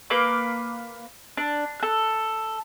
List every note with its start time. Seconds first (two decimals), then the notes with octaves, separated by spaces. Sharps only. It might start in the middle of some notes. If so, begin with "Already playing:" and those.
0.10 A#3 B4 D6
1.38 D4
1.80 A4 F#6